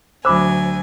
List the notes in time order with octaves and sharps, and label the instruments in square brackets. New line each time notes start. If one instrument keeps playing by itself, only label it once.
[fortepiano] D2 B5 E6 [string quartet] F#3 G#5 [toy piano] C5 D6